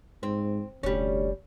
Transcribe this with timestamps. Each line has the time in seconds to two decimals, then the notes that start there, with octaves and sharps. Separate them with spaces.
0.23 G#2 C4
0.83 F1 D2 G3 C#4